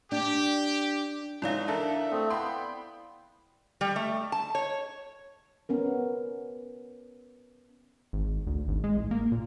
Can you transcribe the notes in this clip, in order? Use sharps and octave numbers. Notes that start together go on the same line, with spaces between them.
D4 G4
G#2 E3 F#3 E4 D5 F5
D4 A4 A#4 E5
A3 C4 D#6
B3 G5 B5 C6
G3
A3
A5
C#5
B3 C#4 A#4
G#1
D2
G#1
G#3
A1
A#3
A#2